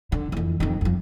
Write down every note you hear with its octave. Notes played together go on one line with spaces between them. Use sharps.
D3
F2 E3
F2 D#3
F2 F3